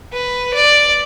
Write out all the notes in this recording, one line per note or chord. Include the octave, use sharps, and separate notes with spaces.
B4
D5